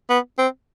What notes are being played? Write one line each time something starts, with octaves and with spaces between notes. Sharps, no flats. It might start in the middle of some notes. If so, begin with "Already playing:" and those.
B3
C4